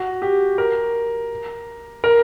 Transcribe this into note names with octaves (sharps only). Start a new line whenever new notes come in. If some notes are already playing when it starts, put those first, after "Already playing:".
Already playing: F#4
G4
A#4
A#4